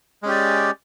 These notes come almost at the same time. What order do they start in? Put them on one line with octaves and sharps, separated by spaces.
G#3 C#4 G4 D5